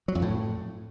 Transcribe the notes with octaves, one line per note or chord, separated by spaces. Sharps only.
F#3
F2
A2